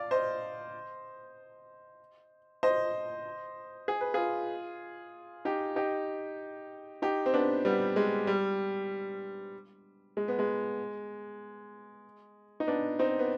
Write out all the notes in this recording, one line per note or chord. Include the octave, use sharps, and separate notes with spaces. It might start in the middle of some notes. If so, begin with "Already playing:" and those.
Already playing: D5 F5
C5 D#5
C5 D#5
G#4
B4
F4 G#4
D#4 G4
D#4 G4
D#4 G4
C4
B3 D4
G3 B3
G#3
G3
G#3
B3
G#3
D#4
B3 D4
C4 D#4
B3